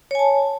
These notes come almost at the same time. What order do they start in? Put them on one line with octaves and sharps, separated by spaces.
C#5 G#5 A5